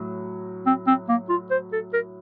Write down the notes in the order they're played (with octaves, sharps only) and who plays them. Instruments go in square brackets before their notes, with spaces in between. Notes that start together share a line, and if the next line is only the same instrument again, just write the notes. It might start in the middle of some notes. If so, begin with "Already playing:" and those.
Already playing: [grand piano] A2 F#3
[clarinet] C4
C4
A#3
F4
C5
A4
A#4